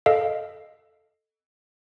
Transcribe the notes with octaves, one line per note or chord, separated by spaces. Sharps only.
A4 D#5 F5